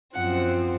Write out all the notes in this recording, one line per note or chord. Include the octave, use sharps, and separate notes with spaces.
F#2 F3 C4 F#5